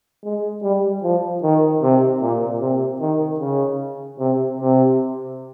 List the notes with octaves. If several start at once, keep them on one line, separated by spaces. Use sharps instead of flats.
G#3
G3
F3
D#3
C3
A#2
C3
D#3
C#3
C3
C3